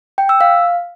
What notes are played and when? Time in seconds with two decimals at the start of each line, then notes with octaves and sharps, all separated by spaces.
0.18 G5
0.29 E6
0.41 F5